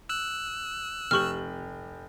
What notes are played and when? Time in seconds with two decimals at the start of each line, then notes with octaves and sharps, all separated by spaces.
0.09 E6 F#6
1.11 F1 G4 C#6 F6 F#7